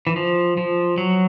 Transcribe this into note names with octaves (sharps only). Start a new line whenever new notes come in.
E3
F3
F3
F#3